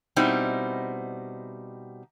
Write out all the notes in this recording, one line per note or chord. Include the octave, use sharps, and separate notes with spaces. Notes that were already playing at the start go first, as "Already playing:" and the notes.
B2 G3 C4 D#4 E4